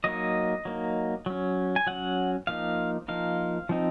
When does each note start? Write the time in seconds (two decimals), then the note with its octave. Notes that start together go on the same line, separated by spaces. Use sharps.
0.04 F#3 A#3 D#4 D#5
0.65 F#3 A#3 D#4
1.26 F#3 C#4
1.76 G#5
1.87 F#3 C#4 F#5
2.47 F3 A#3 D#4 F5
3.08 F3 A#3 D#4 F5
3.69 F3 C4 D#4